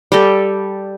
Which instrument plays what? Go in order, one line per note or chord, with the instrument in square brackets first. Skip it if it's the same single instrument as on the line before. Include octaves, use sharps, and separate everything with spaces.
[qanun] G3 G4 A4